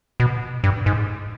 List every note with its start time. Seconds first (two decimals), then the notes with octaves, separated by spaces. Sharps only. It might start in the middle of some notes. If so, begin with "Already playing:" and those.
0.20 B2
0.64 G2
0.86 G#2